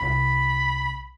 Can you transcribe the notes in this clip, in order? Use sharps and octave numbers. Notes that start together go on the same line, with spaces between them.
C2 B5